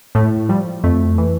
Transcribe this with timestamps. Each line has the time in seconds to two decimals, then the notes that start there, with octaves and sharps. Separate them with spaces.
0.15 A2 A3
0.49 F3 G3
0.84 F2 A3
1.18 E3